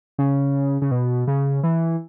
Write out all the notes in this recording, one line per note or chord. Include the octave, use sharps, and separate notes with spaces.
C#3
C#3
B2
C#3
E3